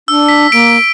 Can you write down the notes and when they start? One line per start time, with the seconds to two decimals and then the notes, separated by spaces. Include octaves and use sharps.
0.08 D4 E6
0.29 B6
0.52 A#3 D7